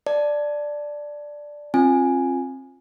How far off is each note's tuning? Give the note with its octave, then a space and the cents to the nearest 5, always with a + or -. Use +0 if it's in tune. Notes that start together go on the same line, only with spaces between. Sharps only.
D5 +0 A5 +0
C4 +35 F4 +0 G#5 +0